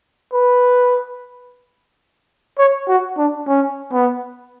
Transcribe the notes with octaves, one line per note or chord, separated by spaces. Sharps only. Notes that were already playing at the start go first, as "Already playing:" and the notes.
B4
C#5
F#4
D4
C#4
B3